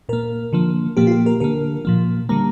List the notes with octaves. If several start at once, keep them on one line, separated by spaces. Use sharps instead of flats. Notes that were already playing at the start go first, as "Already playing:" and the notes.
A#2 A#3 A#4
D3 F3 A#3
A#2 F3 A#3 G4
F4
G4
A#4
D3 A#3 A#4
A#2 F3 A#3
D3 G3 A#3 A#5